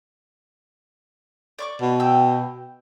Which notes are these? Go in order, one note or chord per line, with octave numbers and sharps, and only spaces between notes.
D5 C#6 D6
B2
G5 E6